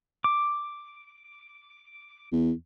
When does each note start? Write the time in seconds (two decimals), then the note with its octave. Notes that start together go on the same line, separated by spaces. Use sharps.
0.24 D6
2.32 E2